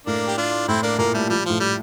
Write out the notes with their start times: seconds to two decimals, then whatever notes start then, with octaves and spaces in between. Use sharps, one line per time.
0.06 A2 A#3 D4
0.28 G4
0.37 D4 F4
0.68 A2 C4 E4
0.83 A#3 D4
0.99 A#2 A#3
1.14 G3 A3
1.30 F3 G3
1.46 A2 F3
1.60 G3